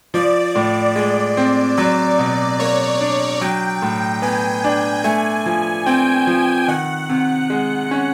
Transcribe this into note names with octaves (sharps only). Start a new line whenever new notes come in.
F3 D5
A2
G#3 D5
C4
F#3 D5
B2
A#3 C#5
D4
F#3 G5
A2
B3 G#5
D4
A3 G#5
F3
C4 G5
F3
D#3 F#5
C3
G#3
C#4